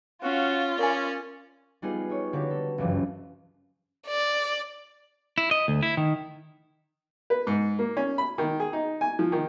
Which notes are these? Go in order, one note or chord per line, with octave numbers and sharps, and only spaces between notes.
C#4 F4 F#4 F5
C#4 A#4 D5 F5 G#5
G3 B3 D#4 F4 G#4
D#4 C#5
D3 A#3 F#4 G4 B4
A4
F#1 C#2 G2 E3 F3
D5
E4
D#5
D2
E4
D#3
B4
G#2
A#3
C#4
B5
D#3
G#4
D#4
G#5
F3
D#3